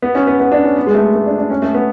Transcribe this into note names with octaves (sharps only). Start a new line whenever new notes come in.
B3
C#4
B3
B3
D4
C#4
B3
G#3
A3
A3
D4
D4
C#4
A3
B3